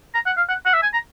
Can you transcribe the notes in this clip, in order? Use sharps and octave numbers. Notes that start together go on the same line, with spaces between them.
A#5
F#5
F5
F#5
F#5
E5
G#5
A#5